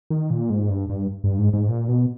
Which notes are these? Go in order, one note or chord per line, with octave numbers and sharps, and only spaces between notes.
D#3
A#2
G#2
G2
G2
G2
G#2
G#2
A#2
B2